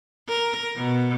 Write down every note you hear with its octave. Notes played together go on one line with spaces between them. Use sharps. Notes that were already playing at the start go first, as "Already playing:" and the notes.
A#4
B2